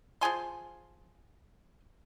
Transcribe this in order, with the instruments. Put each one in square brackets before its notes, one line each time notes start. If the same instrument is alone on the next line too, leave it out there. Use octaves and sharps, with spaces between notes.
[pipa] F3 G#4 G#5 C6